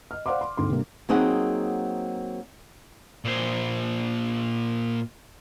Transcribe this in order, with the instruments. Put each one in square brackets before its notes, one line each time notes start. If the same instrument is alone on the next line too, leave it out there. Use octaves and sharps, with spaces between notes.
[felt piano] D#5 F6
C5 D5 F5 F#5 C6 D6
C6
D2 G#2 C4 C6
C3 G3 A#3 D4
[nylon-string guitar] F#3 A#3 C4 D#4 G#4 F#5
[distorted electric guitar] A#2 C5